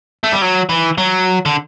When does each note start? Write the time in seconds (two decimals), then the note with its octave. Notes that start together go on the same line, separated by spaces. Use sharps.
0.24 A3
0.32 G3
0.42 F#3
0.69 E3
0.98 F#3
1.46 D3